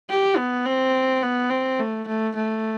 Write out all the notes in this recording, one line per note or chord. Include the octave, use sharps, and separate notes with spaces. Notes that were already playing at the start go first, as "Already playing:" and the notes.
G4
B3
C4
B3
C4
A3
A3
A3